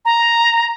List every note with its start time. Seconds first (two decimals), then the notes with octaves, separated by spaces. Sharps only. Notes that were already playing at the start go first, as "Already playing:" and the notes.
0.05 A#5